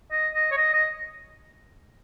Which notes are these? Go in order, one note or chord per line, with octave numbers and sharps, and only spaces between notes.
D#5
D#5
C#5
D#5
D#5